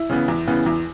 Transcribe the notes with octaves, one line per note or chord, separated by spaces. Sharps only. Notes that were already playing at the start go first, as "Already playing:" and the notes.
Already playing: E4
C#3 E3 B3
E2
C#3 E3 B3
E2